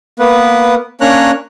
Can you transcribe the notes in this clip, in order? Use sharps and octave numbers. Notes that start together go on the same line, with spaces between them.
A#3 B3 B4
A#3 C#4 D4 C#5 A#5 F#6